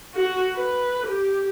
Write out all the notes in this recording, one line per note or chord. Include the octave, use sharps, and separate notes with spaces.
F#4
B4
G4